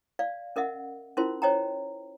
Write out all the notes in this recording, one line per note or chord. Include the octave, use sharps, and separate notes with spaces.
D5 F5
C#4 A#4 D#5 E5 F#5
C#4 E4 F4 A#4 C5 C6
C5 C#5 D#5 G5 A#5